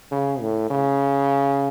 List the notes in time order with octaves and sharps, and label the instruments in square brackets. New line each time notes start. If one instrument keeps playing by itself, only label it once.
[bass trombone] C#3
A2
C#3